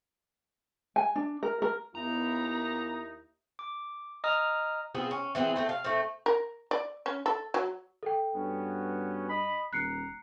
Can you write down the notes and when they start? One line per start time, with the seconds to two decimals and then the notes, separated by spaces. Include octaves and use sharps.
0.96 G#5
1.16 D4
1.43 A#4
1.62 A#4
1.95 D#2 B3 D#4 E4 A#5
3.59 D6
4.24 D#5 A#5 D#6 F6
4.95 B3 C4 F4 G#4
5.11 C#4
5.35 E3 B3 C4 G#4
5.56 A3 C4 A4
5.69 F5
5.84 A3 C4
6.26 A#4
6.71 D5
7.06 C#4
7.26 A4
7.54 F#3
8.03 A4 G5
8.35 G2 B3 C#4 F#4
9.28 D#5 B5 D#6
9.73 D#1 A#5 F#6 C7 C#7